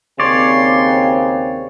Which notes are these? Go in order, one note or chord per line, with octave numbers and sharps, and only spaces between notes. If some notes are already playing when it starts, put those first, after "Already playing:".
D#2 C#3 C4 C#5 D5 C6